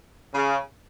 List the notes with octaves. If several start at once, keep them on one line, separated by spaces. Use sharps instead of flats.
C#3